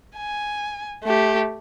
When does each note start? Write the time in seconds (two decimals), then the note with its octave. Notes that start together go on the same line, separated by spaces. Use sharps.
0.17 G#5
1.03 A3 G4